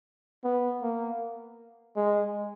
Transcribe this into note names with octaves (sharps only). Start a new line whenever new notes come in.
B3
A#3
G#3